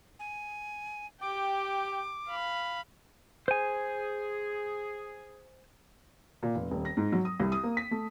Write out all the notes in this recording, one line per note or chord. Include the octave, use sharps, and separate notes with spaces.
G#5
G4 G5 D6
F5 B5
G#4 C5 G#5
A#2
F1
D#1
A#6
G#2
F#3
D#6
C2
D#6
A#3
B6
A3